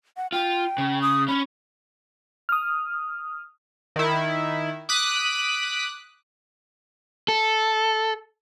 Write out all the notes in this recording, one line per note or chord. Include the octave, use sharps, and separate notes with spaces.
F#5
F4 G5
C#3
D#6
C#4 B5
D#6 F6
D#3 E4
D6 D#6 F#6 B6
A4